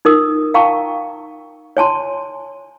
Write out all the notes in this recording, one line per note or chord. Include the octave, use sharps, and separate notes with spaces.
D#4 A#4 D#6
F5 G5 A5 A#5 C#6
C#5 G#5 A5 C6